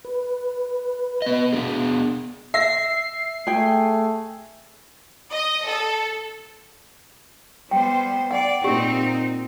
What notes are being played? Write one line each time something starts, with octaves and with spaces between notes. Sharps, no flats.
B4
B3 D#5
B3 D4 G#4
E5 A#6 C7
A3 G#4 G5 G#5
D#5
A4
G3 B3 C5 G5
D5 F#5 G5
A#2 C4 D#4 G4